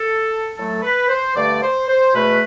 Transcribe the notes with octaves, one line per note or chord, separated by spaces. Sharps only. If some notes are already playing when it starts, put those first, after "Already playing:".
Already playing: A4
A2 F#3 A3 A4
B4
C5
G2 D3 A3 D5
C5
C5
E2 B2 A3 B4